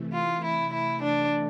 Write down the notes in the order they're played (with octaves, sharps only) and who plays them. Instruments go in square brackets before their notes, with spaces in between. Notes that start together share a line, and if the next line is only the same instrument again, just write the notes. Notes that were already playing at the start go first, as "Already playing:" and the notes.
Already playing: [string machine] C3 E3 A3
[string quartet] F4
E4
E4
D4